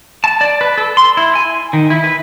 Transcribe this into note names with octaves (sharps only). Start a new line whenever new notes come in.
A5
D5
B4
A4
C6
E4
G#5
D#3
E4
B4